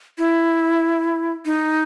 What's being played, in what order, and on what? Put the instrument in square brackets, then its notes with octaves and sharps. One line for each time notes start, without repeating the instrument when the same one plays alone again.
[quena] E4
D#4